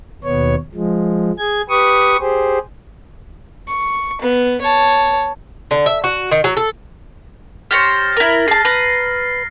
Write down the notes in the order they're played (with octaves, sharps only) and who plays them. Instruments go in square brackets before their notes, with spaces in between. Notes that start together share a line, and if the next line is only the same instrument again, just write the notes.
[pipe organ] D#2 B2 B3 C#5
F3 G#3
G#4 G#6
G4 B4 C#6 D#6
G4 G#4 C5
[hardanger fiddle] C#6
B3
C#5 A5
[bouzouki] D3
E5
F#4
D#3
F#3
A4
[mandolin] G4 C5 C#5 [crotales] F6 A6 A#6
[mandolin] E4 A#4
[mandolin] G#4 A5 [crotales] C7
[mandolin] B4 A#5